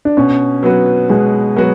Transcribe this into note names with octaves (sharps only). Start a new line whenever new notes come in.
D4
B2 C#4
F#3 B3 F#4 B4
B2 G#3
F#3 B3 F#4 B4